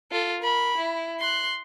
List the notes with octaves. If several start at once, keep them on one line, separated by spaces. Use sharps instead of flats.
F4 A4
A#4 B5
E4
C6 F#6